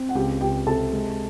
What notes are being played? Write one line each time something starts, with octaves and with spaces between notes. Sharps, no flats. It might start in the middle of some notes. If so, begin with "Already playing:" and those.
Already playing: C4
F#5
C#2 G4 G5
C#2 G4 G5
C3 A4 A5
G#3